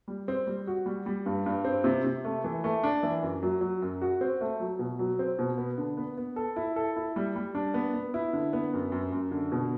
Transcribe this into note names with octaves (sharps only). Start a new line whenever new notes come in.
G3
C4
G3
F#4
G3
G3
G2
G2
C4
C3
C3
A3
E3
A3
D4
E3
F#2
F#3
F#3
F#2
F#4
C4
A3
F#3
B2
F#3
C4
B2
B3
D3
B3
B3
A4
E4
A4
E4
G3
G3
D4
B3
B3
E4
D3
B3
F#2
F#2
F#2
D3
B2